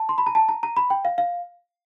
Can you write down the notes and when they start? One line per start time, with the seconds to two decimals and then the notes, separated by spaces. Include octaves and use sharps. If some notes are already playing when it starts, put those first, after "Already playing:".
Already playing: A5
0.09 C6
0.18 B5
0.27 A#5
0.35 A5
0.49 A#5
0.63 A#5
0.77 B5
0.90 G5
1.05 F5
1.18 F5